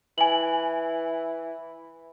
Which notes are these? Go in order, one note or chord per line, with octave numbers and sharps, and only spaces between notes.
E3 G#5 F#7